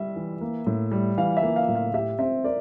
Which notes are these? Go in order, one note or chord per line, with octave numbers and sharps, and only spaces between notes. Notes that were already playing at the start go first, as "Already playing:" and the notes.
Already playing: G3 E5
E3
A#3
A2
G3
E3 F5
E5
A#3
F5
A2
F5
G4 E5
C4 E5
A#4 D5